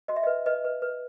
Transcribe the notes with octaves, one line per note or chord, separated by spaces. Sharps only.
F#4 D#5
E5
B4 D#5
B4 D#5
B4
B4